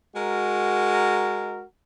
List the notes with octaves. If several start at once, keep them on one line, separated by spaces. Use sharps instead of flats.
G#3 F#4 A#4